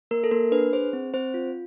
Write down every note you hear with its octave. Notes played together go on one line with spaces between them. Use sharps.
A#3 A#4
A4
A#3 A#4
D4 B4
G#4 C5
C4
C4 C5
F4